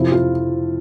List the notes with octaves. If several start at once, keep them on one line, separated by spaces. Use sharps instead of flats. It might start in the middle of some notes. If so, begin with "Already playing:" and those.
Already playing: F2 C3 F3 E4
F4